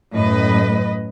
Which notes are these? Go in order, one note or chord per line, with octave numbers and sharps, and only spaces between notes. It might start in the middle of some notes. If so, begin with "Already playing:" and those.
F#2 A2 B4 D#5